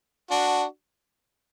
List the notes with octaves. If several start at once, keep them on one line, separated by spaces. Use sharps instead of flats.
D4 F#4